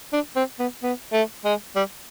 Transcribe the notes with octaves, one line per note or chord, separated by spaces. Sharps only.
D4
C4
B3
B3
A3
G#3
G3